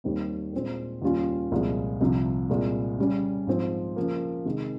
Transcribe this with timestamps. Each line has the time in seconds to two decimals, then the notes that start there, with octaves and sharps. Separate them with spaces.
0.04 D#2 D#3 G3 C4 D#4
0.53 A#2 G#3 C4
1.02 D#2 C#3 G3 C#4 F4
1.51 C2 A#2 F3 G#3
2.01 C2 C3 F3
2.50 C2 A#2 G#3
2.99 C#3 G3 C#4
3.47 G#2 F3 C4
3.96 C#3 F3 A#3
4.45 C3 D#3 G#3 D#4